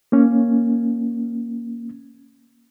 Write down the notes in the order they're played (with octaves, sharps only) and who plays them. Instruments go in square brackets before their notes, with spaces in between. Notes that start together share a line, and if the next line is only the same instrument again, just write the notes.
[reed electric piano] A#3 C#4